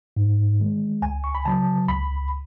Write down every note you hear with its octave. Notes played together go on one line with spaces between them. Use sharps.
G#2
D#3 G#3
C#2 G#5
C#6
B5
C#3 F#3 A5
C#2 B5